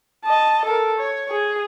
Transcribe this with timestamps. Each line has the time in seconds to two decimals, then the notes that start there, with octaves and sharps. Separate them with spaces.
0.24 D#5 A5
0.65 A4 A#4
0.98 C#5
1.31 G#4